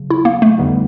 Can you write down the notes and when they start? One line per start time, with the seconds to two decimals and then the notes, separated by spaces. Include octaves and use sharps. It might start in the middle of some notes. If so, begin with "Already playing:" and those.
Already playing: C#3 F#3
0.10 E4
0.25 A#3
0.42 A3
0.58 F2 D3 G3 B3 D#4